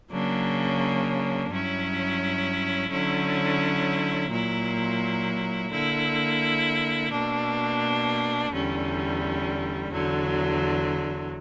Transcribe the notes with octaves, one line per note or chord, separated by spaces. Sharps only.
C#3 F#3 A#3 D4
G2 F#3 C#4 E4
D3 F#3 C#4 E4
A#2 F#3 A#3 E4
D3 A#3 E4
B2 A#3 D4
E2 D3 G3 C#4
E2 D3 F#3